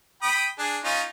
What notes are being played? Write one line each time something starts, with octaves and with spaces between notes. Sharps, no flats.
G5 B5 D#6
D4 G#4
C#4 D#4 F4